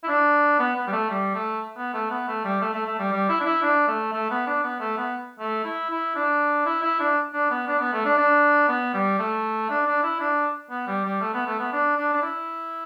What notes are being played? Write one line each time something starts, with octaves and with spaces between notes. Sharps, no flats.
E4
D4
B3
B3
G3
A3
G3
A3
B3
A3
B3
A3
G3
A3
A3
A3
G3
G3
E4
D4
E4
D4
A3
A3
B3
D4
B3
A3
B3
A3
E4
E4
D4
E4
E4
D4
D4
B3
D4
B3
A3
D4
D4
B3
G3
A3
D4
D4
E4
D4
B3
G3
G3
A3
B3
A3
B3
D4
D4
D4
E4